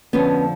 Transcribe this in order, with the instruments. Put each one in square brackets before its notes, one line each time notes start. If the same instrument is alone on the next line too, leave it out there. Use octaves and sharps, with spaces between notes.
[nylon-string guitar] F2 D3 F3 B3 C#4